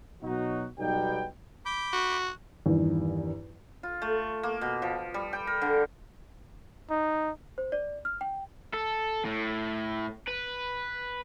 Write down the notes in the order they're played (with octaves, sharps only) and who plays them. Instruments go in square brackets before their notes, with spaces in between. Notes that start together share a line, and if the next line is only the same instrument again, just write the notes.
[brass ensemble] B2 F#3 D#4 F#4
B1 F#3 G3 B3 D#4 G5
[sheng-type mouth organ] B5 D6 G6
[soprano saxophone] F#4
[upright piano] E2 G2 D#3
[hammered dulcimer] F4
A3
A#3
B2
F3
G3
G5
A#4
D3
[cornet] D#4
[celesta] C5
D5
F6
G5
[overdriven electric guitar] A4
A2
B4